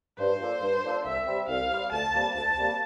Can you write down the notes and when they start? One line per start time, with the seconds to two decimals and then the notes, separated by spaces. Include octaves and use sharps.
0.18 G2 C5
0.40 F3 A#3 D4 A4
0.61 G2
0.83 F3 A#3 D4 A4
1.05 C2 E5
1.27 C3 G3 C4
1.48 C2 F5
1.70 C3 G3 C4
1.92 D2 A5
2.13 C3 G3 A#3
2.35 D2 A5
2.57 C3 G3 A#3